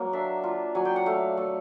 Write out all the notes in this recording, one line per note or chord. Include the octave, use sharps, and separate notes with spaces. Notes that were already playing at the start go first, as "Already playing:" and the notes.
Already playing: F#3 A#3
D4 E5
F4
F#3 G#5
G5
F#5
A3 F5
A3